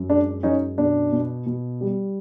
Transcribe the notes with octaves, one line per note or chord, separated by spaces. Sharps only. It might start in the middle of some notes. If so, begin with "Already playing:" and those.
Already playing: F#2
G#3 D4
F#2 C#4 D#4
B2 D4
B2
B2
G3